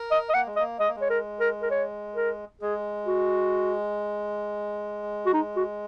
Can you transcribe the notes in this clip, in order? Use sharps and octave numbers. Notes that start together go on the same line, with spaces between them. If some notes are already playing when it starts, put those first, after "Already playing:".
Already playing: A#4
D#5
D#5
A#3 F#5
G#3
D#5
A#3
G#3 D#5
A#3
G#3
C#5
A#4
A#4
A#4
C#5
A#4
G#3 G#4
F#4
F#4
D#4
F#4